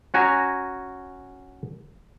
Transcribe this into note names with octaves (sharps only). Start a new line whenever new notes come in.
C#4 F#4 G#5 A#5